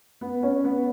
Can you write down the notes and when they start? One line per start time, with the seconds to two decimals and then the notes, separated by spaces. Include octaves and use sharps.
0.21 B3
0.43 C#4
0.65 B3